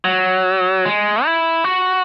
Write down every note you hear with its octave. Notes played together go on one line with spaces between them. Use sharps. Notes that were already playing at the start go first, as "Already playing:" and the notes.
F#3
G#3
E4
F#4